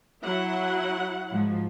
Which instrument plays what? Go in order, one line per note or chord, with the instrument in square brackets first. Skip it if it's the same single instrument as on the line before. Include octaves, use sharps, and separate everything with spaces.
[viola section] F#3 E4 F#5
[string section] G#2 F3